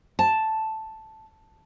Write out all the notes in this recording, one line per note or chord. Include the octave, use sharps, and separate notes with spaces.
A5